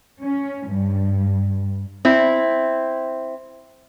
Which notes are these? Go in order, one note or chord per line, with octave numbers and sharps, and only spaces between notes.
C#4
G2
C4 E4